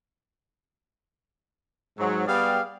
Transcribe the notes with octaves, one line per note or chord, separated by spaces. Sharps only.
G#2 F#3
G3 B3 G4 G#4 D5 F5